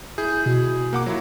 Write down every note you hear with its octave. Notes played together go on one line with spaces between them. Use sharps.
E4 G#4 G6
B2
A#3 F#5 D6
F#3 E4 F4